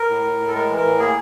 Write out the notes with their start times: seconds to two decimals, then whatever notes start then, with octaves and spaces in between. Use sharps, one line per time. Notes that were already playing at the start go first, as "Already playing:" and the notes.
Already playing: A#4
0.09 A2
0.24 A2
0.39 A2
0.48 A4
0.54 G#3 A#4
0.69 E3
0.77 A#4
0.85 A2
0.99 A#3 G#4